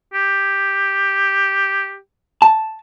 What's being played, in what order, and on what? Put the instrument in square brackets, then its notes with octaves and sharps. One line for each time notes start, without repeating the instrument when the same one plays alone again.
[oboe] G4
[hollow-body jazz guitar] A5